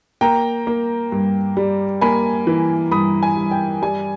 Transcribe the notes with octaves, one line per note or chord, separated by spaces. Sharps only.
A#3 G5 A#5
A#3
G2
G3
A#3 G#5 B5
E3
G2 B5 D#6
G#5
G2
G5
G3 G#5